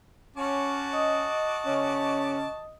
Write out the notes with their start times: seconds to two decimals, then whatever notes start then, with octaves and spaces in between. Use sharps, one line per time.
0.37 C#4 F#4 A5 D6
0.93 D#5 D#6
1.65 C#3 C#4